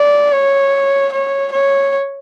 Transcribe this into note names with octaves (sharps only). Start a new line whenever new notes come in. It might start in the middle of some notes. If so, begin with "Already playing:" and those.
Already playing: D5
C#5
C#5
C#5